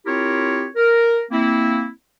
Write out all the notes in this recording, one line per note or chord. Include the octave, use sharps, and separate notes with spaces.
C4 E4 F4 G4 A#4 C#5
A#4
A#3 C4 E4